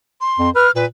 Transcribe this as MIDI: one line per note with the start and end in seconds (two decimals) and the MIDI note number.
0.21 0.50 84
0.39 0.49 41
0.55 0.68 71
0.55 0.71 89
0.76 0.86 46
0.76 0.85 71